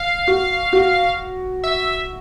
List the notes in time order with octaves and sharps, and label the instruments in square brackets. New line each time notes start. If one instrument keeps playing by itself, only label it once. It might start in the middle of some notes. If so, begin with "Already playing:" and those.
Already playing: [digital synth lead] F5
[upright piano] F#4
F#4
[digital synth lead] E5